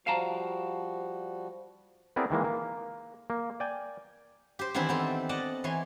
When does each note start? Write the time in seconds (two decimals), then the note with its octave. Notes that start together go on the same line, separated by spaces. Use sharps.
0.07 F3 G3 F#4 F5 A5 A#5
2.16 B3 C4 E4 G#4 A#4 D5
2.30 D#3 E3 G#3 A#3
2.44 A#3
3.30 A#3
3.60 D5 G5 G#5
4.59 G4 C5
4.74 D#3 E3 B3 C4 D4 E4
4.89 B3 C4 A4
5.29 D5 D#5 F#5 A5
5.64 E3 C#5 G#5 C6